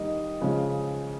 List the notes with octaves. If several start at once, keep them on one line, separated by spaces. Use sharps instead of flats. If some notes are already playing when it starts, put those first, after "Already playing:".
Already playing: D#3 G3 A#3 D#4 D#5
C#3 F3 G#3